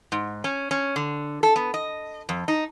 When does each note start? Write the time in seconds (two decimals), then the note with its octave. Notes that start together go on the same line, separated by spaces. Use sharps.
0.12 G#2
0.44 C#4
0.71 C#4
0.96 D3
1.43 A4
1.56 B3
1.74 D#5
2.29 F2
2.48 D#4